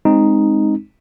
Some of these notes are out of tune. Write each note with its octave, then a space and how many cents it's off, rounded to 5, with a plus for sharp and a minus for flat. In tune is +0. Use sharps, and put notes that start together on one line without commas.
G#3 +0 C4 +15 D#4 +0